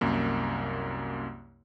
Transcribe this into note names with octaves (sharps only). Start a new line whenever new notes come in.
C2 F#2 A#3